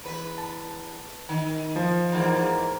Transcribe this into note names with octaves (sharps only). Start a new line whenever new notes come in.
E2 B4
A5
D#3
F3
E2 G#2 A#3